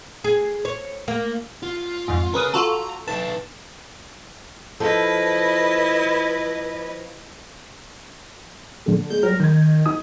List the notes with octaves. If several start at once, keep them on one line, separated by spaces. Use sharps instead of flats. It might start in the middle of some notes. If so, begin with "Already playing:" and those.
G#4
C#5
A#3
F4
F2 G#2
C#4 G#4 A#4 B4 D#6
F4 F#4 A4 A#5
D#4 B4 A5
F3 E4 A4 B4 D#5
D3 A3
G#3 G6
F#3 G3 A#4
D#3 G6 G#6
D#4 D#6